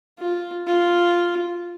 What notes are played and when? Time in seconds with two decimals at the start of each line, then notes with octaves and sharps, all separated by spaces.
0.19 F4
0.67 F4